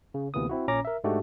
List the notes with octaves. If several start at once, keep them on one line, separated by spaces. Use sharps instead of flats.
C#3
D2 C3 E3 A#3 B3 D#6
C4 E4 F#4
A#1 A#2 C#4 A#5 D6 A#6
A#4 E5
G#2 G#3 A3 D4 F#4 G4